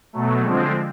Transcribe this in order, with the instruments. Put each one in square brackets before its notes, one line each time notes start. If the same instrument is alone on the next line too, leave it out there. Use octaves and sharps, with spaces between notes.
[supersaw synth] B2 F#3 A3
D3 F3 G#3 C4